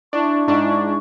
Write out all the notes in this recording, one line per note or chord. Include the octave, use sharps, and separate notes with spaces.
D4 E4 C#6
G#2 D4